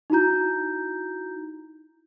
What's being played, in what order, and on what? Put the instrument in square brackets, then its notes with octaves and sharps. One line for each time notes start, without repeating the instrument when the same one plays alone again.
[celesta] D#4 E4 F#4 A#5 G6